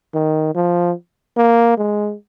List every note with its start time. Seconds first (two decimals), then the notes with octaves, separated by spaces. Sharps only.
0.14 D#3
0.55 F3
1.36 A#3
1.77 G#3